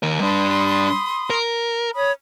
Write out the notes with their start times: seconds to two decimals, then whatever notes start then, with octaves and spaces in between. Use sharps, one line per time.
0.03 D#2 A#4
0.20 G2 D4 B5 C6 D#6
1.30 A#4
1.95 C#5 B5 D#6